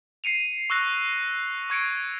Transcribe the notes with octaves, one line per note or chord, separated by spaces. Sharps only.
C7 C#7 D#7 F7
C#6 E6 F#6 A#6
C#6 G#6 C#7 D7